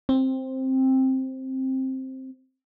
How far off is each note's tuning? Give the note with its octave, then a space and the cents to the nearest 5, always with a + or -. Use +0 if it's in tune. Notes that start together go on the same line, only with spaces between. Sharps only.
C4 +10